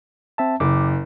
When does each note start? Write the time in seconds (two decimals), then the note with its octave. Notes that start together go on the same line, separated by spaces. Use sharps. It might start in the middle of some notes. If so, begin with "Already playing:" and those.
0.38 C4 E5 A5
0.60 F#1 D6